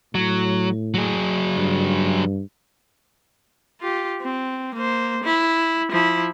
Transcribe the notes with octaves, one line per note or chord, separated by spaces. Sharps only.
A2 F#3
F#3 G#4
G2
F4 G4
C4
A#3 C5
E4
F3 E4